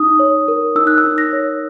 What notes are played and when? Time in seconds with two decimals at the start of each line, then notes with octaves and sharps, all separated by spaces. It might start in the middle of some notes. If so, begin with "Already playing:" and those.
Already playing: D#4 D#6
0.19 C#5
0.48 A#4
0.76 D#4 E6
0.87 F#6
0.98 E6
1.04 D#4
1.18 A#6
1.33 C#5